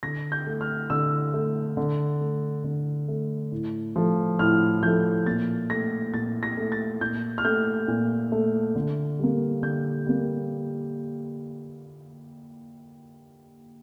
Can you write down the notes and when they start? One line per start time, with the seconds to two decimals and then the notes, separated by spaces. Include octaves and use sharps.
0.03 D3 A#6
0.32 G6
0.47 A3
0.61 F6
0.90 D3 E6
1.34 A3
1.77 D3
2.21 A3
2.64 D3
3.08 A3
3.52 A2
3.96 F3 A3
4.39 A2 F6
4.83 F3 A3 G6
5.26 A#2 A6
5.70 A3 A#6
6.14 A#2 A6
6.43 A#6
6.57 A3
6.72 A6
7.01 A#2 G6
7.38 F6
7.45 A3 G6
7.88 A#2
8.32 A3
8.75 D3
9.19 G3 A#3
9.63 D3 G6
10.06 G3 A#3